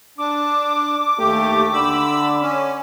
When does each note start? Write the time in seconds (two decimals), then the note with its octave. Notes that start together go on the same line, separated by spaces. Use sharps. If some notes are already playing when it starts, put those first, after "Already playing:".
0.18 D4 D6
1.19 D#2 A3 G4
1.73 D3 B5 E6
2.41 C#4